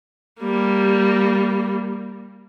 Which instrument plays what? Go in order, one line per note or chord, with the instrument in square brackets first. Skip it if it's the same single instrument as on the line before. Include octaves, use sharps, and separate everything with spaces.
[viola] G3 A#3